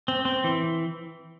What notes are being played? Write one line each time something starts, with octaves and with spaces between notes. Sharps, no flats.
C4
C4
E3